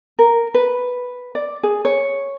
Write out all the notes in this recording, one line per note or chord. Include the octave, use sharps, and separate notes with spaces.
A#4
B4
D5
G#4
C#5